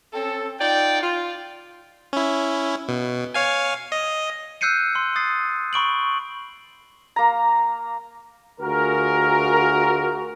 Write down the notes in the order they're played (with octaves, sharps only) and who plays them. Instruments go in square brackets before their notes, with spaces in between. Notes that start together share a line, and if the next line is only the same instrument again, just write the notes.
[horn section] C4 C#4 A4
D#4 F4 D5 G5
F4
[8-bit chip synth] C#4 E4
B2
C#5 F5 G#5
D#5
[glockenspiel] E6 F#6 G6 C7 C#7 D#7
C6
D#6 A6 C7
B5 C#6 D7 F#7
[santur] A#3 A#5
[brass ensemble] D2 F4 F#4 G#4 A#4